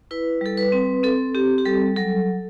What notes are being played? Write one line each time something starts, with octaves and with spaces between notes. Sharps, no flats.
E4 B4
G3 A4
B4
C4
C4 A4
C4 G4
G4
G3 A4
F#3 A4